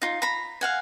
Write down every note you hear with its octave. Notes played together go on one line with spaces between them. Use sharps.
D#4 F4
A#5 B5
F5 F#5 G#5